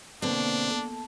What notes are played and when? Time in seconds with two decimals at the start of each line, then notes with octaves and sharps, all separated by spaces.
0.22 B2 D3 A#3 C4 D4
0.70 A4